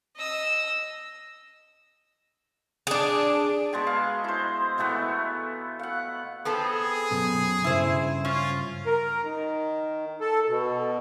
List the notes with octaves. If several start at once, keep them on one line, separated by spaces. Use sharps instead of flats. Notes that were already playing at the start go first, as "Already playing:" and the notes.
D#5 E6
D4 G#4
B2 G#3 G#4 A5
F5
E4 C5
B2 E3 A3 B3
F5 F#5
B3 C4 G#4 A4
F#2 B2
G2 C#3 E4 C5
C#4 F4
A#4
D#3
A4
B2